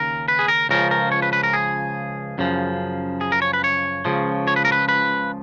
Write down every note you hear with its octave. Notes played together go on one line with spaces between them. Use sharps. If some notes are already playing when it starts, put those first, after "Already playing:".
Already playing: D#2 C#3 A#4
B4
G#4
A#4
C#2 C#3 F3 A#4
A#4
C#5
B4
B4
A#4
G#4
F#2 C#3 F3
G#4
A#4
C#5
B4
C#5
C#2 C#3 F3
C#5
B4
A#4
B4
B4